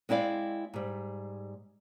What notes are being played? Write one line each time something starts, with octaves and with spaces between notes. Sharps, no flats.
G#3 C4 E4 D5 F5
G#2 G3